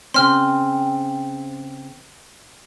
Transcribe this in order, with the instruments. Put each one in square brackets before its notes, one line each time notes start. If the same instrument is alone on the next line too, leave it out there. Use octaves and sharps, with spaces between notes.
[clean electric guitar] C#3 C4 [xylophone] C6 F6